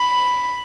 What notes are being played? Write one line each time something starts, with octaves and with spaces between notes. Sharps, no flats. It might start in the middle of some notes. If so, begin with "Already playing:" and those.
Already playing: B5